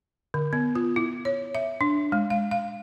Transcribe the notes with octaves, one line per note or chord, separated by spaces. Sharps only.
D3
B3
F4
E4
C#5
E5
D4
G#3
F5
F5